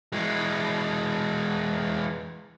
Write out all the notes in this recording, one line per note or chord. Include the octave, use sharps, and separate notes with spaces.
E3 G#3